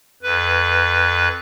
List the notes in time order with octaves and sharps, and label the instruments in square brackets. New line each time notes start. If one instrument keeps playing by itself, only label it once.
[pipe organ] F2 B4